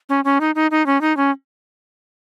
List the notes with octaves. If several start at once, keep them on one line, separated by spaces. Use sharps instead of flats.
C#4
C#4
D#4
D#4
D#4
C#4
D#4
C#4